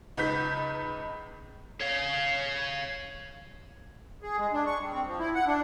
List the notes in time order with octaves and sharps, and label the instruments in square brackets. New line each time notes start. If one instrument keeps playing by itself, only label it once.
[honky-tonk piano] C#2 D#4 B4 G6 B6
[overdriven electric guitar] C#5 F5
[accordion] G#4
G#3
D4
C#6
G3
C4
F3
E4
F#5
D4